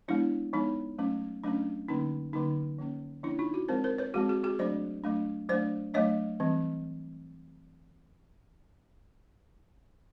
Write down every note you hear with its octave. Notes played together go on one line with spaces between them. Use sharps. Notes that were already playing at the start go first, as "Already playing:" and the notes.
F3 G#3 B3 D4 E4
F3 G#3 B3 D#4
F#3 A3 C#4
F#3 A3 C#4 D4
D3 F#3 A#3 C#4 D#4
D3 F#3 A#3 C#4 D#4
F3 A#3 C#4
F3 A#3 C#4 D4 E4
D#4 F4
E4 F#4
F3 G#3 C4 A#4 C5
A#4 C5
B4 C#5
F3 G#3 C4 F#4 G#4
F#4 G#4
F#4 G#4
F#3 A3 D4 C5 D5
F#3 A3 D4
F#3 A3 D4 C5 D5
F#3 A3 D4 C#5 D#5
E3 G3 C4